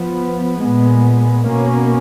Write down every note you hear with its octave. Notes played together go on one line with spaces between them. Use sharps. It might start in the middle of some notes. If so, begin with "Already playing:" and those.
Already playing: F3 B3
A#2 G#3 B3
B2 A#3 C#4